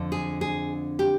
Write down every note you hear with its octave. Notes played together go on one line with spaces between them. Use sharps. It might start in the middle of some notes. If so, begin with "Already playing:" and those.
Already playing: F2 D3
G#4
G#4
G4